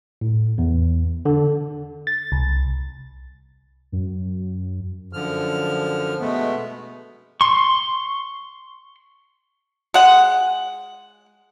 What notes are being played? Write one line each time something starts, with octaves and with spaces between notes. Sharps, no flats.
A2
E2
D3
A6
C2
F#2
F#2 D3 F3 F6
B2 G#3 A3 B3
C6 C#6
G#3 F#5